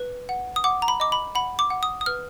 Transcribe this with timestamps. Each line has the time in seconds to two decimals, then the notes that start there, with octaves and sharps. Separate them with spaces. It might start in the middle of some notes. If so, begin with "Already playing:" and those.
Already playing: B4
0.29 F#5
0.56 D#6
0.64 F#5 D6
0.82 A#5
0.88 B5
1.00 D#5 D6
1.12 B5
1.35 F#5 B5
1.59 D6
1.70 F#5
1.83 D#6
2.01 D#6
2.06 B4 F6